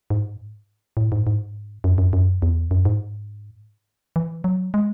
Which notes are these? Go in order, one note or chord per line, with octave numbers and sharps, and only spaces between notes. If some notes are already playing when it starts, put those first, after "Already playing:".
G#2
A2
G#2
G#2
F#2
F#2
F#2
E2
F#2
G#2
E3
F#3
G#3